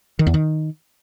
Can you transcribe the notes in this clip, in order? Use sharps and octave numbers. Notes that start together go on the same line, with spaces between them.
D#3
E2
D#3